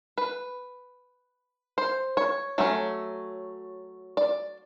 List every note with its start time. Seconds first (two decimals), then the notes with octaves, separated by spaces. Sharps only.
0.18 B4
1.78 C5
2.17 C#5
2.58 F#3 A3 C#4
4.17 D5